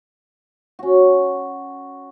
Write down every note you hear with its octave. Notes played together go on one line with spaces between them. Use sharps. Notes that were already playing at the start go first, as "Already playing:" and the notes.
C#4 F#4